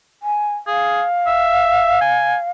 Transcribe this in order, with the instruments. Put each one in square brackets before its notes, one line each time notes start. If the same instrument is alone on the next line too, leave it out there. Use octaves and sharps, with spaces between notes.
[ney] G#5
[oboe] G#4 [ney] F5
[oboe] E5
G#5